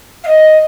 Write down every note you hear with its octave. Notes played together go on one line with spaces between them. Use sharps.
F5
D#5